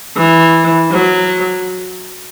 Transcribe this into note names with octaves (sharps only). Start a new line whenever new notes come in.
E3
F#3